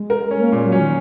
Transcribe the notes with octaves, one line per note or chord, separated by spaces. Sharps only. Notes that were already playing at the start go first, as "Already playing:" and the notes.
Already playing: G#3
A#4
C#4
A#3
A#2 G#3
F#3
C#4
D#3